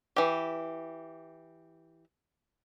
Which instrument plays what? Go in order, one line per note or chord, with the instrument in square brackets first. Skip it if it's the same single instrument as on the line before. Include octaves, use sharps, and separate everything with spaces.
[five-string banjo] E3 G4